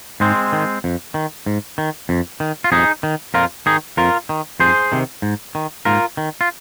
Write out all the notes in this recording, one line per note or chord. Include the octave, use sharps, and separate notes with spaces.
G#2 G#3 C4
D#3
F2
D#3
G#2
D#3
F2
D#3
F4
F2 D#4 G#4
D#3
F2 F4 A#4
D#3 D#4 G#4
F2 F4 A#4
D#3
F2 G#4 C5
C3 D#3
G#2
D#3
G#2 F4 A#4
D#3
F4